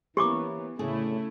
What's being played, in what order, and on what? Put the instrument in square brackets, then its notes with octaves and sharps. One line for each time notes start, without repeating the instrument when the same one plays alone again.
[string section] E3 B3 [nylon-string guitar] A#3 C#4 E4 [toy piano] G4 C#6 D6
[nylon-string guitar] D2 A2 G#4 [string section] C#3 A3 E4